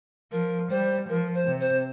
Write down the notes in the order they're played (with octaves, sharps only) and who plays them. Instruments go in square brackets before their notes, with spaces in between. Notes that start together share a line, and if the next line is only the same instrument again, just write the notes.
[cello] F3 [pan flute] A#4
[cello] G3 [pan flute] C5
[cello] F3 [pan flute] A#4
[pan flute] C5
[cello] C3
[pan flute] C5